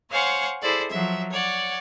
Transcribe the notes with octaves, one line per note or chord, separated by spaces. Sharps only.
C5 C#5 F5 F#5 G#5
E4 G#4 A4 C5 D5
F3 F#3 E5
C#5 D5 F#5